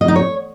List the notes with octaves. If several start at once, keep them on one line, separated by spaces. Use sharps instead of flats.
D#5
D#4
C#5